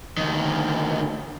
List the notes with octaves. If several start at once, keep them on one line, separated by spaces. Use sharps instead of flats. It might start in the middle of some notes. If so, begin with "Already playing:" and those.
D2 D#3